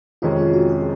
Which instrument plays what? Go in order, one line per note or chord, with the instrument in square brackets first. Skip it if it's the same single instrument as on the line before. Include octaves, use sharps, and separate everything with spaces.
[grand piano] F2 C3 D#3 G#3 C#4 [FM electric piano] F4
[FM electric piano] F4
F#4
G#4